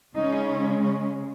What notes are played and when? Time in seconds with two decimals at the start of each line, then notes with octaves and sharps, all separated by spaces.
0.14 C#3 G#3 C#4 D#4
0.83 C#4